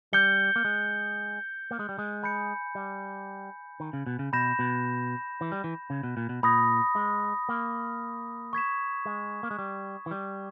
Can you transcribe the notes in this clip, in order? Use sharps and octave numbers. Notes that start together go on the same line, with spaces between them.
G3 G6 C#7 G7
A#3
G#3
A#3
G#3
G3
G#3
G#5 B5 G6 C#7
G3
D#3
C#3
B2
C#3
B2 B5 G6 A#6 E7
B2
E3
G3
E3
C#3
B2
A#2
B2
A#2 B5 D#6 A#6
G#3
A#3
C#6 G#6 B6 E7
G#3
A#3
G#3
G3
E3
G3